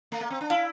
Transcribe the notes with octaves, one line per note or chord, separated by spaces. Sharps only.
A3
A#3
C4
D4
E4 F5